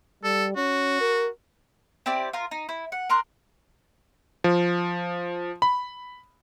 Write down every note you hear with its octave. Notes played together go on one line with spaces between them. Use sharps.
G3 A4
C#4 F#4
A#4
C4 E4 G4 D5
F4 A#4
D#4
E4
F#5
A#4 A#5 C6 F#6
F3
B5